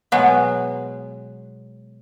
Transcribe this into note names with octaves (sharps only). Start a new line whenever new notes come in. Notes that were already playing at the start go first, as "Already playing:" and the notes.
B2 F#3 G#3 B3